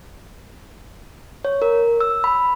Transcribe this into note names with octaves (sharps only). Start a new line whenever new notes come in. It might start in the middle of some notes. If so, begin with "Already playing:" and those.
C#5
A#4
E6
B5